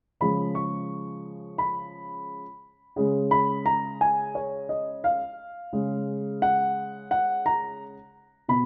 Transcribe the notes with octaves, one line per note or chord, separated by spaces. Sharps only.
C#3 F3 G#3 B5
C#6
B5
C#3 G#3
B5
A#5
G#5
C#5
D#5
F5
C#3 G#3
F#5
F#5
A#5
B2 B5